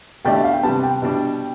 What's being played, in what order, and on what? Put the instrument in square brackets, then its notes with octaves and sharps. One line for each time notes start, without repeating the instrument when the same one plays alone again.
[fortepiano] B2 A3 D4 G4 D5 [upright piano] G5
[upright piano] E5
F5
G5
[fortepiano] C3 G3 B3 [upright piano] A5
[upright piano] G5
[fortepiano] B2 G3 D4